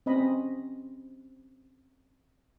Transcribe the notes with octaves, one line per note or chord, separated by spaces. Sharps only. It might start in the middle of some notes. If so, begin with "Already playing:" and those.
C4 C#4 D#5 B5